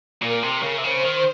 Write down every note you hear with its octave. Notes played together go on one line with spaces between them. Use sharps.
A#2 A#4
C3
A#4
C#3
C3
C#3 C5
D#3